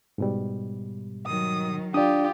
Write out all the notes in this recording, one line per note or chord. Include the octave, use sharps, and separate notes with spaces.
G#2 B2 G3
D#3 F#3 D#6
D4 F4 G4 D5 D#6